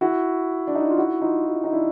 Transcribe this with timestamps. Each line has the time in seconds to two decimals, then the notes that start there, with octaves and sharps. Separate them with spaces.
0.01 E4 F#4
0.67 D4
0.75 D#4
0.82 E4
0.90 F4
0.98 E4 F#4
1.22 D#4 F4
1.46 F4
1.55 E4
1.64 D#4
1.72 D4 E4